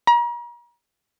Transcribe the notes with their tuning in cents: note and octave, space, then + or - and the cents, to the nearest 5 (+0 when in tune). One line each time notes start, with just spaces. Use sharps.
A#5 +40